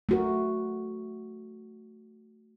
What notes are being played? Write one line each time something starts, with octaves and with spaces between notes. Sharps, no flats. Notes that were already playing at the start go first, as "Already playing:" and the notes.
A3 F#4 A#4